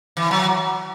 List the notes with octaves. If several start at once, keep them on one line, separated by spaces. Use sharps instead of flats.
E3
F#3